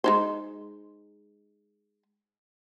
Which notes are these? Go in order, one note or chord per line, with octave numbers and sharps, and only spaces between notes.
G#3 D#4 C5